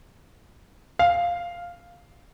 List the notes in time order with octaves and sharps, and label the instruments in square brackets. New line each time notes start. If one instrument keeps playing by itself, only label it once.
[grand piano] F5